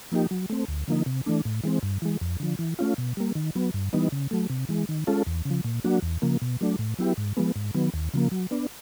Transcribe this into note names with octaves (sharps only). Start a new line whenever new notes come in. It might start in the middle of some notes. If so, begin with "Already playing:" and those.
F3 A#3 D#4 G4
F#3
A3 C4
D2
D3 F3 A#3 D#4
C3
E3 A3 D4
A2
E3 G#3 C4
G2
E3 G#3
F2
D3 F3
E3
A3 C#4 F4
B2
G3 A#3
D#3
F#3 B3
G2
E3 G3 B3 D#4
C#3
F#3 A3
C3
E3 G#3
D#3
G#3 C#4 F4 A4
E2
C#3
F3
A#2
F#3 A#3 D4 F#4
E2
C#3 F3 A#3
B2
F#3 A3 D4
A2
F#3 B3 E4 G4
G#2
F3 G#3 B3
G#2
D#3 F#3 B3
D#2
C#3 F3 A#3
F#3
B3 D4